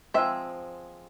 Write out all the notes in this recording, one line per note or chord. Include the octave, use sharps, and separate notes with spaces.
F3 G#3 C4 E5